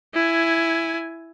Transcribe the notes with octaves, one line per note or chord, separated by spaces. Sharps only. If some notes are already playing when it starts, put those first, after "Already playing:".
E4 G#5